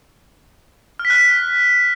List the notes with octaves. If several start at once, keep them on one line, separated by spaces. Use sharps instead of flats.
F6
B6
F#6
B6